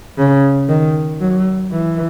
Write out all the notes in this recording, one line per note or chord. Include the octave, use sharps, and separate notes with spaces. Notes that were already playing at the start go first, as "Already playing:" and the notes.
C#3
D#3
F#3
E3